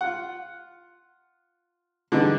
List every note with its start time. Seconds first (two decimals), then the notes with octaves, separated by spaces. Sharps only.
0.01 F4 F#5
2.12 D3 E3 G3 G#3 D4 D#4